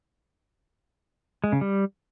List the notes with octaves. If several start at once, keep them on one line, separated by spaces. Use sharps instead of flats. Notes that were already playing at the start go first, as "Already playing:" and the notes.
G#3
C#3
G3